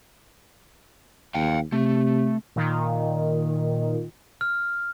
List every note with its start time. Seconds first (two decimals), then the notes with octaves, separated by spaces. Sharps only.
1.34 D#2 F5 G5
1.72 C3 A3
2.56 A#2 D#3
4.41 F6